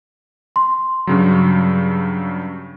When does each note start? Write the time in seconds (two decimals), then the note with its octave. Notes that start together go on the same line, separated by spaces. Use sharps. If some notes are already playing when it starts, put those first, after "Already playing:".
0.56 C6
1.07 G2 C#3 F#3